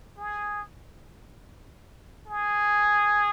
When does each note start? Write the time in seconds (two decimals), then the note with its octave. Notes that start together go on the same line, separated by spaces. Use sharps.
0.17 G#4
2.26 G#4